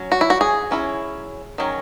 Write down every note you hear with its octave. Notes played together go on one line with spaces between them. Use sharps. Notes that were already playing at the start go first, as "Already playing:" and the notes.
Already playing: F#3 C#4
F#4
E4
F#4
G#4
F#3 C#4 E4
D#3 F#3 C#4